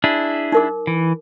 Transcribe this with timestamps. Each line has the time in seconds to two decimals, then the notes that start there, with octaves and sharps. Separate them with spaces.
0.04 D4 E4 G#4
0.52 D#4 A#4 D6
0.87 E3